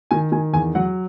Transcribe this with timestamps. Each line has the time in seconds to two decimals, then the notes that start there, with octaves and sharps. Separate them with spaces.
0.11 D#3 G#5
0.32 D#3 G#5
0.53 E2 G#5
0.75 F#3 F#5